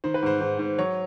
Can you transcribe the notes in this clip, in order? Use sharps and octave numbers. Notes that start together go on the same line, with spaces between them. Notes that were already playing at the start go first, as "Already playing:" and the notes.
D#3 C5
B4
G#2 C5
G#2
G#2
F#3 C#5